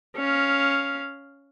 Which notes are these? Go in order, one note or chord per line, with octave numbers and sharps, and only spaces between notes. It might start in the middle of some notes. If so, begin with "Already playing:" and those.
C#4 F5